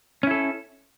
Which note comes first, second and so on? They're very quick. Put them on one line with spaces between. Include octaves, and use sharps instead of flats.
C#4 E4 A4